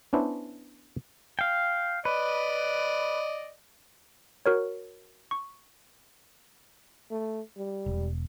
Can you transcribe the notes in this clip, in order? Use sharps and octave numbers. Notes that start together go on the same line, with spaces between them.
B3 C#4 D4 E4 C5
F5 G5
B4 D5 D#5
F#4 A#4 C#5
C#6
A3
G3
E1